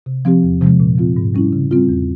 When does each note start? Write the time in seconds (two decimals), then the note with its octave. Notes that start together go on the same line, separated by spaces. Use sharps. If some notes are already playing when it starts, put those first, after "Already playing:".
0.06 C3
0.25 F3 C4 G4
0.43 E2
0.61 C3 F3 G#3
0.80 A#2
0.98 F3 C4 F4
1.17 G#2
1.35 G3 C#4 E4
1.53 C#3
1.71 G3 C4 F4
1.89 E2